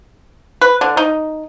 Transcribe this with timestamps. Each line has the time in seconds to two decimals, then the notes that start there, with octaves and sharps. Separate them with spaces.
0.61 B4
0.81 D3
0.97 D#4